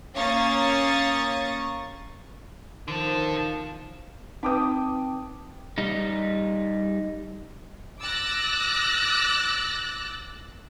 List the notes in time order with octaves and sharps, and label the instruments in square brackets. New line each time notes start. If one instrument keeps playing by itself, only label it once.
[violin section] A#3 C#4 F5 C#6 D#6 A6
[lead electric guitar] D3 A4 [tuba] D#3 [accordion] F3
[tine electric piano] C4 A5 [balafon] D#4 B4 [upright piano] G5 D6 D#6
[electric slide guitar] G3 D#4
[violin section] D6 E6 F#6 A6 A#6